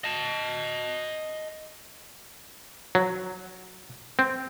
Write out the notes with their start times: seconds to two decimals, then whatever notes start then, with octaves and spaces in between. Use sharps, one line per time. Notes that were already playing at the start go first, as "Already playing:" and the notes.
0.04 D#5 A5
2.95 F#3
4.19 C4